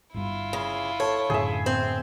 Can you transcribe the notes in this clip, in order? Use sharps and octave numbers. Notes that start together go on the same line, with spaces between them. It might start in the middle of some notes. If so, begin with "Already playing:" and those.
G1 G2 E4 F4
C#3
A4 C#5
F#2 A2 D3 G#4 E5
C4